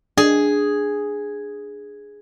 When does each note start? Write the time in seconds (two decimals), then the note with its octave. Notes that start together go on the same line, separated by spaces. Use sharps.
0.17 D4 G#4